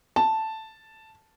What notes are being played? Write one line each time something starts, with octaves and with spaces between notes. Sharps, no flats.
A5